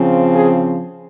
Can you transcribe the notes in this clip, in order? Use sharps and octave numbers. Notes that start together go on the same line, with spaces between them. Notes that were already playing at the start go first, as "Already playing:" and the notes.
Already playing: C#3 F3 C4
G#4